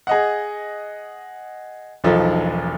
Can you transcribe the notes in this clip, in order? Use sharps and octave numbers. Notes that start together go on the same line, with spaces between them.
G#4 D#5 F#5
E1 B1 F3 D#4 A4